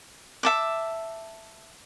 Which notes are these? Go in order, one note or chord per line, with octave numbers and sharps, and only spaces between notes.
E5 A5 D6